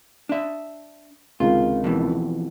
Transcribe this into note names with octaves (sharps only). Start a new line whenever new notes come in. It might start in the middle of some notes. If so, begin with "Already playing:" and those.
D4 E5
C#2 C3 D#3 F4
F2 B2 E3